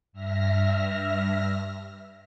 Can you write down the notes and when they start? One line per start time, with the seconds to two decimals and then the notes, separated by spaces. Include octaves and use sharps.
0.13 G2 E5 F6 A#6